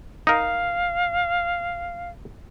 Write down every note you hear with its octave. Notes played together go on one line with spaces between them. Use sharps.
D#4 A#4 F5